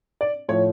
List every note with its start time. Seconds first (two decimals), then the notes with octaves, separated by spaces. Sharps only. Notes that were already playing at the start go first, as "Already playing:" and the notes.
0.21 D5
0.49 A2 F3 C#5